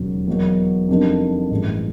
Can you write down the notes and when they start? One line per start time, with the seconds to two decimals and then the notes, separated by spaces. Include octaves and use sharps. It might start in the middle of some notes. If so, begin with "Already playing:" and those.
Already playing: E1 D#2 C#3 F#3
0.27 E2 B2 F#3 A#3
0.89 F2 D3 G3 A#3 D#4
1.51 A1 G2 E3 G#3